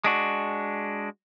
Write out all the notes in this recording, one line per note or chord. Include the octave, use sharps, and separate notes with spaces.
G#3 D4 F#4